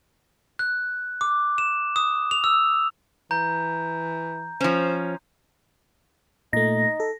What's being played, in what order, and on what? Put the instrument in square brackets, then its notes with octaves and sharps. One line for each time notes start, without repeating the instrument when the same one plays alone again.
[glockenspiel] F#6
D6
E7
D#6
F7
E6
[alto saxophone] E3 [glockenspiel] A#5 G6
[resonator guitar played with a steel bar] F3 C#4 [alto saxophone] C5
[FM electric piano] A#2 A3 [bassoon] D#4 [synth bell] A#6
[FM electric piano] A4